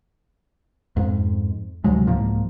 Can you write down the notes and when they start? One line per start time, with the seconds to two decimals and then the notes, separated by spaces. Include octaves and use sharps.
0.97 F2 G#2
1.84 D2 C3 F#3 G#3
2.07 C2 G#2 F3 A#3